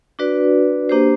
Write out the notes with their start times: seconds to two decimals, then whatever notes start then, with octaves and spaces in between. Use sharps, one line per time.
0.19 D4 F#4 B4 D5
0.89 A#3 D4 G4 C5